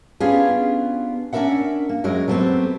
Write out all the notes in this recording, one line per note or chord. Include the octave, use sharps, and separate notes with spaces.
B3 C#4 D4 F4 G4 G#4
C#4 D4 G4 A#4 E5 F#5
A#3
F#2 F#3 G#3 A#4
F#3 G3 A3 B3 C4 G4